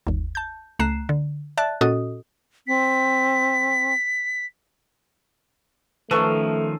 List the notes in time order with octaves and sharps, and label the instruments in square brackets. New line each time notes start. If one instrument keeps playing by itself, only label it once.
[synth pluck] G1 D#2
A5 G6
C#2 A3 A#5 F#6 C7 E7
D3
D5 E5 A5 F#6 A6
A#2 C#4 F#4 A4 D#5 D#6
[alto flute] C4 [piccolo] B6
[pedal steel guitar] D#3 F3 [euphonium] A3 [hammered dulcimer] C#4 A4 [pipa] B4 A5 C#6